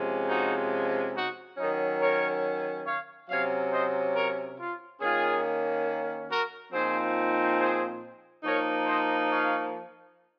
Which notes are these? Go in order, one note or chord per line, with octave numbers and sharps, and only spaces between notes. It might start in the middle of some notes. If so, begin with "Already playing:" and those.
Already playing: C3 F3 G#3 C#4
D#4 F#4
D#4 F#4
D#3 F#3 C#4 D#4
A#4 C#5
C#5 F5
C3 F#3 C#4 C#5 F5
C5 D#5
A#4 C#5
F4
D#3 A#3 C#4 F4 G#4
F#4 A#4
A#2 F3 C4 D#4 G#4 C5
G#4 C5
F3 A#3 D#4 A#4 C#5
C5 D#5
C#5 F5